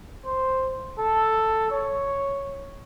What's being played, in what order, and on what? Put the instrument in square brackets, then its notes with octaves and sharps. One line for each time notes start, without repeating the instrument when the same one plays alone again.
[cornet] C5
A4
C#5